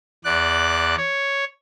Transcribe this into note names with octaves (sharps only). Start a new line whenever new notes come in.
E2 D5 F#6
C#5